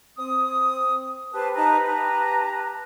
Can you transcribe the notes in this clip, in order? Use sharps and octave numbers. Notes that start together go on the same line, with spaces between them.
C4 D#6
G4 B4 C5 A5
D#4 A5 A#5
A5 A#5